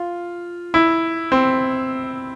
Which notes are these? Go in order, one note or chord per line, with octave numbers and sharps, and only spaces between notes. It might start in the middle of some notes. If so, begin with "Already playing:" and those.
Already playing: F4
E4
C4